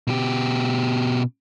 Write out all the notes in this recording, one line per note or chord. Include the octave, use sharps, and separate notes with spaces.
B2 G4